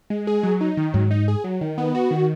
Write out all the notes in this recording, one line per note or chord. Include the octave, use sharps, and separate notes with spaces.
G#3
G#4
F#3
D#4
D#3
G#2 F#3
D#4
G#4
F#3
D#3
B3
F#4
D#3